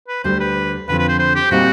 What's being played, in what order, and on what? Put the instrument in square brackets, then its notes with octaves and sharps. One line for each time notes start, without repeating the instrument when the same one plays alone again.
[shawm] B4
[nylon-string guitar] D2 D3 G3 [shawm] C5
[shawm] B4
[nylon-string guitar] F2 D3 F3 [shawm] B4
[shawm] B4
C5
C5
G4
[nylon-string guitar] A#2 G3 C4 D#4 [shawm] F#4